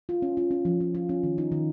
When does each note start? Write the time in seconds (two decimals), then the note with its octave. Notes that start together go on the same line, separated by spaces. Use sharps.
0.09 F4
0.22 C#4
0.37 F4
0.51 C#4
0.65 F3
0.80 C#4
0.95 F4
1.09 C#4
1.23 D#3
1.38 D#4
1.52 D#3